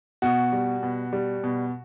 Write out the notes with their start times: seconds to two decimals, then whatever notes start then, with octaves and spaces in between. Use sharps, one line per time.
0.22 B2 F#4
0.53 G3
0.83 B2
1.13 G3
1.44 B2